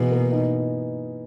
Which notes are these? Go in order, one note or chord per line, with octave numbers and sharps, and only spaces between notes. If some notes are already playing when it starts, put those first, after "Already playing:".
Already playing: B2 E3 A#3 G#4
A#3
D#4